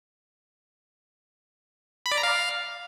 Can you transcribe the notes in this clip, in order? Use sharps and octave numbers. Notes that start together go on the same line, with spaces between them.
B5
D5
A#5
F5